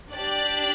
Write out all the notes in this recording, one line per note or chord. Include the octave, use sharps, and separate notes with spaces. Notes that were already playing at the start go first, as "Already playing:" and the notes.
D4 G4 D5